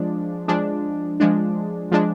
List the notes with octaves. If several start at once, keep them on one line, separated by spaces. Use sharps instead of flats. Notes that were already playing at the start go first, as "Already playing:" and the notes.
Already playing: F3 G#3 D4
F3 G#3 D4
F3 G#3 D4
F3 G#3 D4